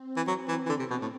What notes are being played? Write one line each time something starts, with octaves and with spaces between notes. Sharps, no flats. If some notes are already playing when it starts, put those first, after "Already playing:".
Already playing: C4
E3
F#3
E3
E3
D3
C3
B2
A2